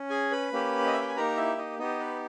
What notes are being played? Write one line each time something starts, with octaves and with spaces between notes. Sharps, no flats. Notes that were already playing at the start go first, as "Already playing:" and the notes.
Already playing: C#4
G#4 G#5
B4 B5
A#3 C#4 G4
D#5
E5
G5
G#5
A#3 D#4 G4 A#4 A#5
E4 E5
D#4 D#5
B3 D#4 G4 D#5
B4